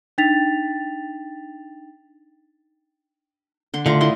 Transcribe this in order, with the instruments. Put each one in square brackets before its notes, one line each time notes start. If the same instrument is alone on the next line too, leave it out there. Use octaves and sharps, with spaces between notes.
[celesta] D4 D#4 G5 A6 B6 F7
[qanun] D3 C6
[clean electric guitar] D3 [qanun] A3 F4 A#5
[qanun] E4 D#5 C6